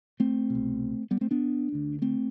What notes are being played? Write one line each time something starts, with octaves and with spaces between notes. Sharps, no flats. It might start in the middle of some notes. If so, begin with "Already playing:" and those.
A3 C4
C2 B2
G3 B3
A3 C4
B3 D4
D2 D3
A3 C4